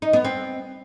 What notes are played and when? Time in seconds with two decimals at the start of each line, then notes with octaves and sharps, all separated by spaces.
0.02 D#4
0.13 B3
0.25 C4